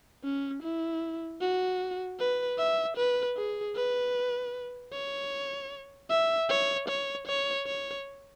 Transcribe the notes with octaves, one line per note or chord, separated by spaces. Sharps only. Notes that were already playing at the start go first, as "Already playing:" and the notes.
C#4
E4
F#4
B4
E5
B4
G#4
B4
C#5
E5
C#5
C#5
C#5
C#5